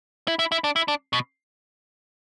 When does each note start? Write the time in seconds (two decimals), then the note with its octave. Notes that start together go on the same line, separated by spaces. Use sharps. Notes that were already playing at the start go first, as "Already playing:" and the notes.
0.28 E4
0.39 E4
0.52 E4
0.64 D4
0.76 E4
0.88 D4
1.13 B2